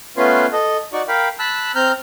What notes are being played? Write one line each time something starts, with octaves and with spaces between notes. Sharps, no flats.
A3 B3 C#4 F4 B4 C6
A4 D#5
D#4 F#4 D5 C#6
A#4 F5 G5 B5
A5 B5 E6 F#6
C4 A#5 F6 G6